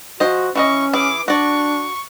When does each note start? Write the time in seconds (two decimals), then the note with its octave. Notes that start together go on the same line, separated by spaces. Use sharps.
0.20 F3 F#4 C5 D#5
0.55 E3 C#4 F#4 D#5 C#6
0.93 E3 G#4 D6
1.28 D4 F#4 D5 C#6